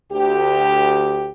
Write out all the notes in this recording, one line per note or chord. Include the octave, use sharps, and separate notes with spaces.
D2 G4